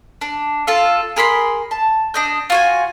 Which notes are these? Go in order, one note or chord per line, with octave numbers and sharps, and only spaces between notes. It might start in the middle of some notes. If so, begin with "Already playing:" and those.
D4
F4 A4 F5
G#4 A#4 B5 C6
A5
D4 D#5 G6
F4 F#4 G#5